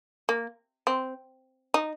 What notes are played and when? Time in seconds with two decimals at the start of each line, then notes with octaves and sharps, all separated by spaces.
0.29 A#3
0.87 C4
1.74 D#4